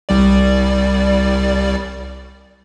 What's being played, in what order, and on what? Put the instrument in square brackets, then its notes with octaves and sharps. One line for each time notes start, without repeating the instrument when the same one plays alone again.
[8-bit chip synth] C2 G3 D5